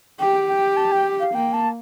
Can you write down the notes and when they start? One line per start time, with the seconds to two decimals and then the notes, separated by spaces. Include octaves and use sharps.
0.20 G4 G5
0.49 G5
0.77 A5
0.92 G5
1.20 F5
1.35 A#3 G5
1.53 A5